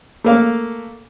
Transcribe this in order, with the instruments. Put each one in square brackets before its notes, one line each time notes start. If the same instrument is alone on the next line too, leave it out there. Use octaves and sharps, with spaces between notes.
[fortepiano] A3 A#3 F5